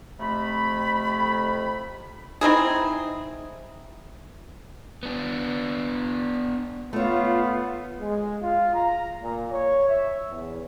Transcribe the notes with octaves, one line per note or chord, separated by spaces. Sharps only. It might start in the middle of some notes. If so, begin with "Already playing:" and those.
F2 C3 A3 B5
C4 D#4 E4 G#4
B3 D4
A3 B3 F4 C#5
G#3
F4
A#5
A#2
C#5
E5
E2